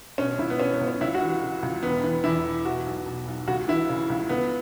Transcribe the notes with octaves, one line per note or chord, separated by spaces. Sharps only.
B2 C#4
C#2 E4
B3
B2 C#4
B3
C#2
C#4
C#2 E4
F#4
E3
F#4
C#3
C#2
E1 B3
E3
E2 E4
E1
B2 F#4
B1
B2
B1
C#2 F#4
E3 E4
C#3
C#2
C#2 B3